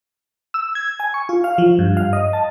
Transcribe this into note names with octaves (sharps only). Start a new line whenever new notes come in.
E6
G#6
G#5
C#6
F4
F5
F3
G2
F5
D#5
A5